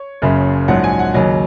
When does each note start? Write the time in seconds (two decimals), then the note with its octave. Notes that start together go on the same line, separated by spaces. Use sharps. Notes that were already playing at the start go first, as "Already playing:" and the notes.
Already playing: C#5
0.22 F#1 F#2 C#3
0.68 A#1 G#2 F#3 F#5
0.84 G#5
0.99 F#5
1.14 D#2 C#3 F#3 D#5